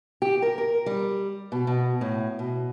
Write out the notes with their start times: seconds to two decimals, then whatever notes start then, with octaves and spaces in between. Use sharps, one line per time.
0.22 G4
0.42 A#4
0.58 A#4
0.86 G3
1.52 B2
1.67 B2
2.01 A2
2.39 B2